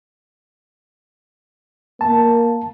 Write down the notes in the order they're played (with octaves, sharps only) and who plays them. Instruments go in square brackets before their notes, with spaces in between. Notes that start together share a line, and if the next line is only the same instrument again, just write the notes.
[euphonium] A#3 [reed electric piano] A5